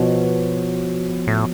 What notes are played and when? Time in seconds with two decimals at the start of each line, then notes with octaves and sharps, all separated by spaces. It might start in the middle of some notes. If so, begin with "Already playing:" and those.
Already playing: B2 F3 B3 F#4 C#5
1.27 A2